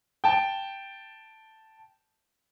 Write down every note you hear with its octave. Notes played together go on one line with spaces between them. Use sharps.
G5 A5